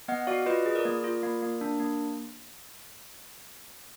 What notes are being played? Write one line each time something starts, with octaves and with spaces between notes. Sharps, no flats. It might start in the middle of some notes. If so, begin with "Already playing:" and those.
B3 D#5 F#5
F#4 D5 F5
F4 B4 D#5
G#4
A#4 D5
A#3
F4
A#3
A#3
D4
A#3